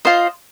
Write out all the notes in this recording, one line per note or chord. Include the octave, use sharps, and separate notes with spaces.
F4 C5 D#5